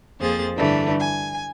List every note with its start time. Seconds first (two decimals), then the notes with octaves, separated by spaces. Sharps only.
0.20 F2 F3 A#3 G#4 C5 A6
0.56 G2 D3 E3 G3 A3
0.99 G#5